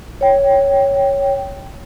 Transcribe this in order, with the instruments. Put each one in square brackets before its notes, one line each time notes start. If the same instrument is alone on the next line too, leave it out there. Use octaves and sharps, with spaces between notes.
[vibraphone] C#5 G5